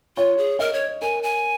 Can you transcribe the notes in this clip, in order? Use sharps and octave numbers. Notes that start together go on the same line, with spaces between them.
F4 C#5
G#4
A#4 D#5
C#5
A#4 G#5
G#5